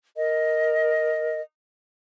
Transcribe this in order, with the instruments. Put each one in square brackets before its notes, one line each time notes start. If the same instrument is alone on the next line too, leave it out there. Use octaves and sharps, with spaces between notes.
[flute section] A#4 D#5